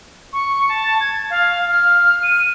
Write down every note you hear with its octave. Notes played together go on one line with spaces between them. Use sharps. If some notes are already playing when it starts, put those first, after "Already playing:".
C#6
A5
G#6
F5
F6
D#7